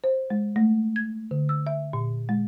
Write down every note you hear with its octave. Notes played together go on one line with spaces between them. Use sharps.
C5
G#3
A3
G#6
D3
E6
E5
A#2
G#3